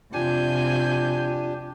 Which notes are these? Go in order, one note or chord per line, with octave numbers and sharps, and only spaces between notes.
F2 C3 D4 F4 G4 G#5 G6